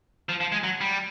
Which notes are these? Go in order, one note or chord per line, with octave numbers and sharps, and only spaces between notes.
F3
F3
G#3
F#3
G3